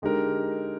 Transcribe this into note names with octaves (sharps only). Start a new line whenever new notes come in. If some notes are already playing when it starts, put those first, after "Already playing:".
D3 G#3 D#4 G4 A#4